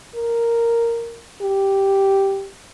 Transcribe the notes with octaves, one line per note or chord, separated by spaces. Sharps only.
A#4
G4